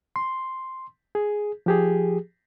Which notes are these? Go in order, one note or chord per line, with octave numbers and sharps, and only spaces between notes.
C6
G#4
F3 G4 G#4